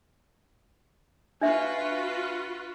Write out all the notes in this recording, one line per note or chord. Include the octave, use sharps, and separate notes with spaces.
D4 F4 F#4 B4 E5